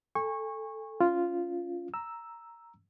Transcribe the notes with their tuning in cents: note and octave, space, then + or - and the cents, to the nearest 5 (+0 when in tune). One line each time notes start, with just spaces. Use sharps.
A4 +0 G#5 -40 C#6 -15
C#4 +15 F4 -5
A#5 +0 E6 +0